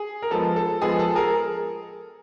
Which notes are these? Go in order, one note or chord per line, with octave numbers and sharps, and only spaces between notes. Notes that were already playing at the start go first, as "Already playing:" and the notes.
Already playing: G#4
A#4
F3 G#3 B3 A4
A4
F3 G#3 B3 G#4
A4
G#4 A#4